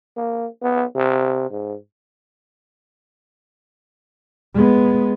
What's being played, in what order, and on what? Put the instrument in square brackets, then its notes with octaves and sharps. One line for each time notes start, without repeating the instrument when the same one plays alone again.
[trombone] A#3
B3
C3
G#2
[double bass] G#3 B3